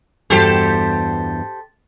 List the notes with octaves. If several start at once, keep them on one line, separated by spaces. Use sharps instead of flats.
E2 G2 F#4 G4 A4 C5